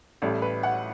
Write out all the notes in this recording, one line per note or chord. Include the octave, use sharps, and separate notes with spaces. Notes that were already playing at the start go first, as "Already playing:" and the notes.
A1 A2 G3 A4
B4
F#5